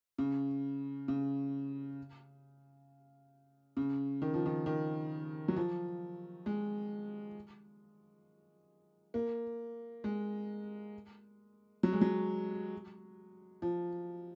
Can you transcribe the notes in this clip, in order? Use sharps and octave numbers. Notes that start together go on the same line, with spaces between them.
C#3
C#3
C#3
D#3
F3
D#3
D#3
F#3
F3
G#3
A#3
G#3
F#3
G#3
F#3
F3